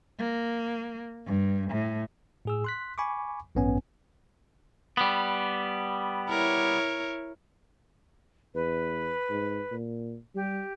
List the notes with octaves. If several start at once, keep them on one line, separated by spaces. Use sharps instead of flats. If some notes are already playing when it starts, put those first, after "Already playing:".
A#3
G2
A2
A2 G#4 E6
C6 F#6 B6
G#5 B5 C#6 D6
A1 G2 B3 C#4 G#5
G3 B3
E4 A#4 C#5
E2 B4
G#2
A#2
G3 G4